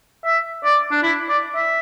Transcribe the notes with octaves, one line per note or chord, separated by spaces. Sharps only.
E5
D5
D4
E4
D5
E5